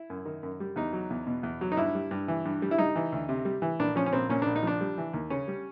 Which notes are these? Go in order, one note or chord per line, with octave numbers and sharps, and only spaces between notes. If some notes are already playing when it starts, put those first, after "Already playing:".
Already playing: E4
F#2
D#3
F#2
G3
E2 D#4
F#3
E2
B2
E2
F#3
D#4
G2 E4
G3
G2
E3
G2
G3
E4
G3 D#4
E3
D2
C3
G3
E3
A#1 D4
F3 C#4
C#4
A#1 C4
A#2 C#4
D4
A#1
D#4
F3 D4
G3
E3
D#2
C#3 C#4
G3